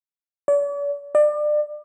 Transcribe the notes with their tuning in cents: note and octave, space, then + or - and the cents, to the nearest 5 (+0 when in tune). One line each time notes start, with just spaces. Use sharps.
D5 -45
D5 +30